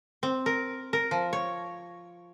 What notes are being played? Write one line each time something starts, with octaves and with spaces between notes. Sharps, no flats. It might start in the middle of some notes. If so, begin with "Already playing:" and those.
C4
A#4
A#4
F3
C#5